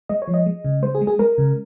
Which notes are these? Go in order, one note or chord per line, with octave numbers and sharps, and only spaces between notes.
G#3 D#5
C#5
F3
D#5
G#3
C#3
G#3 C5
G#4
G#3
G#4
G#3 A#4
C#3